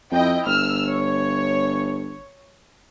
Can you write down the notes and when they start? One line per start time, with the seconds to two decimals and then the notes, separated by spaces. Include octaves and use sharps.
0.11 F2 E4 D#5 G5
0.46 G1 E6 F6
0.87 C#5